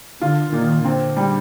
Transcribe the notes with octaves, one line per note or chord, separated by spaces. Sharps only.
D3 F4
A#2 D#3
D3 C4
G3